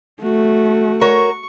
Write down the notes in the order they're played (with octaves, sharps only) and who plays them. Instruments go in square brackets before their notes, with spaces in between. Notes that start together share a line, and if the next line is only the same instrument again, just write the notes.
[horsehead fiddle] A3 [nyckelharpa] F#4
[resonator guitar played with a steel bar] F#4 A#4 C#5 [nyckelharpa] C#6